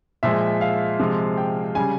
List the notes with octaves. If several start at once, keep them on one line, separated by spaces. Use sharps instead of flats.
A#2 F3 G#3 E5
F5
C3 F3 G#3
G5
C#3 G3 G#5